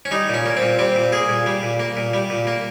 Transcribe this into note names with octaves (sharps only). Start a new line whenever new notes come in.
C#4
G3 D#4
A#2
C#4
A#3
C4
A#2
G3 C4
A#2
A#3 G#4
A#2
G3
A#2
A#3
A#2
G3
A#2
A#3